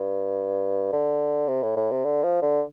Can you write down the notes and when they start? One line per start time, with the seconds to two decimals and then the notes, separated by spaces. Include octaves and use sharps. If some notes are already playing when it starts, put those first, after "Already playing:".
Already playing: G2
0.92 D3
1.48 C3
1.63 A2
1.77 A2
1.91 C3
2.05 D3
2.24 F3
2.42 D3